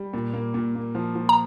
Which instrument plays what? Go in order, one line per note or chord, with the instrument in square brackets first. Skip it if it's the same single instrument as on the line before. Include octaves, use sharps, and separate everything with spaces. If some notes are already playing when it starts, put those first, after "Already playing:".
Already playing: [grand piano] G3
A#2
A#3
A#2
A#3
F3
F3
[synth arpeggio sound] A#5